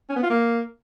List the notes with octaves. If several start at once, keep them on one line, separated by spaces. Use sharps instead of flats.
C#4
B3
F4
A#3